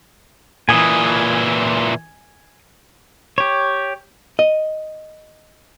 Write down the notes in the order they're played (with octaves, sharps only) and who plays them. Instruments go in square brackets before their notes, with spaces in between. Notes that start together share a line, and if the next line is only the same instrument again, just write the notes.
[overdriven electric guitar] A#2 E3 [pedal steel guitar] G#5 D#6
[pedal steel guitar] G4 C#5
[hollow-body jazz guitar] D#5